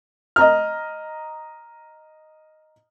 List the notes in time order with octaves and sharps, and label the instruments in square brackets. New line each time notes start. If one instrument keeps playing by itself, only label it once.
[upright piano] D#5 A#5 F6